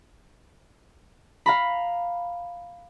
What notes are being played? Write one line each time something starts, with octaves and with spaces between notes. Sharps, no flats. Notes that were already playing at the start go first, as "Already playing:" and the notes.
F5 A#5 B5